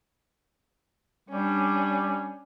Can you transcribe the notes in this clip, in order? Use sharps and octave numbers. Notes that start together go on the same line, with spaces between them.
G3 C#4 D4